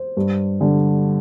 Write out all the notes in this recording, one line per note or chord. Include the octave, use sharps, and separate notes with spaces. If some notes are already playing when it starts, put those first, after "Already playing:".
Already playing: C5
G2
D3 G3